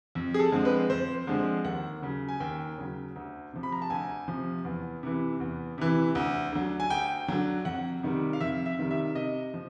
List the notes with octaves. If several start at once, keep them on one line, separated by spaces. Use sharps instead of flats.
F2
G#4
A4
D3 F3 G#3 C4
B4
F2 C5
D3 F3 G#3 C4
D#2 F#5
C#3 F#3
G#5
D#2 G5
C#3 F#3
D2
C3 F3
B5
A#5
A5
D2 G#5
C3 F3
E2
C3 E3
E2
C3 E3
D2
D3 F#3
G#5
D2 G5
D3 F#3
F2 F#5
C3 D#3 G3
F5
F2 E5
E5
C3 D#3 G3
E5
C3 D#5
F3